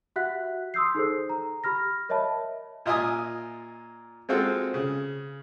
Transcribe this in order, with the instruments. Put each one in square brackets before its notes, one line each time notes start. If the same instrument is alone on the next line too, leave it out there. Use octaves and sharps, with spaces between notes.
[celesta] F#4 G4 E5 F#5 F#6 B6
C6 D#6 E6 G6 C7
D#4 G#4 A4 C5
A#5
G4 B5 F6 A#6
A#4 C#5 D#5 E5 A5 B5
[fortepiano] A#2 F4 D#5 E5 G#5 D#6
G#3 C4 F4 F#4 A4
C#3